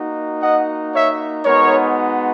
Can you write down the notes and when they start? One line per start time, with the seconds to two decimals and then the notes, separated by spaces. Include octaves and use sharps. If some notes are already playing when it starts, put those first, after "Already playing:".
Already playing: A#3 D#4 F#4
0.41 D#5 F#5
0.93 C#5 E5
1.45 G#3 B3 D#4 F#4 A#4 C#5